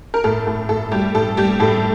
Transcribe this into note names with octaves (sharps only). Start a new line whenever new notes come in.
A#4
A2 A4
A2
A2 A4
G3 G4
A2 A4
G3 G4
A2 A4